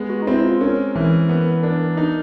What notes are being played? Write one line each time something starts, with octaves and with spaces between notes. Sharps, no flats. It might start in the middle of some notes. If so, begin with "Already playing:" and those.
Already playing: G#3 B3
F#4
D#4
C4 E4
F4
C#4 A#4
E3
B3
D4
D#4